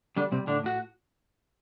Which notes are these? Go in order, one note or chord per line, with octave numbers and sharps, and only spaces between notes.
D3 G3 D4
C3 G3 C4
A2 D3 D4
A2 F#4